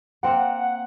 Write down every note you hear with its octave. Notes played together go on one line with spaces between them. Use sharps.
A#3 C4 F#5